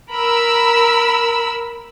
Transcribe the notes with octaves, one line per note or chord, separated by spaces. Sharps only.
A#4 B5 E6